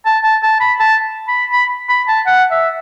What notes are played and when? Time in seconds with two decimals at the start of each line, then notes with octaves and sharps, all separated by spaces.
0.06 A5
0.24 A5
0.43 A5
0.61 B5
0.80 A5
1.28 B5
1.52 B5
1.89 B5
2.08 A5
2.27 F#5
2.51 E5